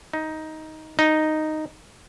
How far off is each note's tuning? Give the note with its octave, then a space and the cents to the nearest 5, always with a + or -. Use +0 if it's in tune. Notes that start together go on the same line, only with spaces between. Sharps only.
D#4 +10
D#4 -5